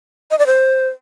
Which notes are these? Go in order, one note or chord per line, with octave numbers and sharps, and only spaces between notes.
D#5
D5
C5